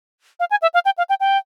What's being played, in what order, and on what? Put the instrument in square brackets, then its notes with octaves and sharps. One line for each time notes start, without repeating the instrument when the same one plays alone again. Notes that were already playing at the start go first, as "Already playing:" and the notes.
[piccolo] F5
G#5
E5
F5
G5
F5
G5
G5